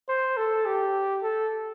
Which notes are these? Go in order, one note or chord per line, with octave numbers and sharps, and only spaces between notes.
C5
A4
G4
A4